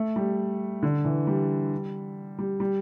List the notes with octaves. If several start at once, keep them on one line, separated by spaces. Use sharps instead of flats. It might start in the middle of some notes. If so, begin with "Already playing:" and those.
Already playing: A3
G3
D3
E3
G3
G3
G3